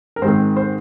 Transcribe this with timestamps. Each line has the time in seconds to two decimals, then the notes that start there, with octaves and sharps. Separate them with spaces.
0.16 A#4
0.22 G#2 D#3 G#3 C4 C5
0.57 C5